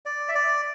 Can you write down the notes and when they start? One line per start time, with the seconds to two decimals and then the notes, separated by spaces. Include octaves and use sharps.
0.06 D5
0.29 E5
0.35 D5